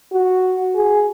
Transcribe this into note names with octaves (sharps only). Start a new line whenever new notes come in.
F#4
G#4